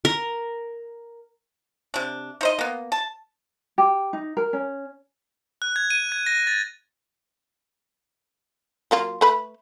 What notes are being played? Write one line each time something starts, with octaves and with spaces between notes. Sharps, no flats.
A#4
C3 D4
D#4 C5 D#5
A#3 B3
A5
G4
D#4
A#4
C#4
F#6
G#6
D#7
G#6
A#6
A6
F#3 A#3 F4
A3 B4 B5